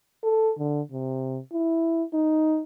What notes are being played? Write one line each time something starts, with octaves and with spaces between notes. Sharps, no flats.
A4
D3
C3
E4
D#4